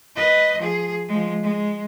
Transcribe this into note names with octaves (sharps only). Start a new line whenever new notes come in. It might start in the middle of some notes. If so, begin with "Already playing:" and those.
B4 D#5
F3 G#4
F3 G#3
G#3